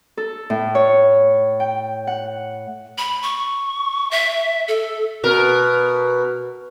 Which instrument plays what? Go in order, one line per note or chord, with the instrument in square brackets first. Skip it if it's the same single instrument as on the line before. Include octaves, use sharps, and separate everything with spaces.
[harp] A4
A2
C#5
G5
F#5
[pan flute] B5
C#6
E5
A4
[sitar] B2 A#4